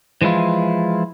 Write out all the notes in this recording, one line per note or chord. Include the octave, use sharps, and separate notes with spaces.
E3 F3 G#3 E4 F4